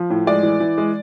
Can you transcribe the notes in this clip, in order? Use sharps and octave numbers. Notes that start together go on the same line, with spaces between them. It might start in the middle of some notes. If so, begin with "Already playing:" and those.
Already playing: F3
A2
G#3 D5
E3
E3
G#3